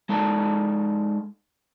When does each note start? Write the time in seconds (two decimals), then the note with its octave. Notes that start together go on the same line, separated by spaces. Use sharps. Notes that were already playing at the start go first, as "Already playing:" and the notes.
0.09 G#3 D#4 A4 D5 A5